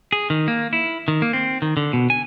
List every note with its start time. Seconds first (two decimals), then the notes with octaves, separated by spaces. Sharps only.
0.12 G#4
0.30 D#3
0.48 A#3
0.73 E4
1.08 D#3
1.22 A#3
1.33 C4
1.62 D#3
1.77 D3
1.93 B2
2.10 G#5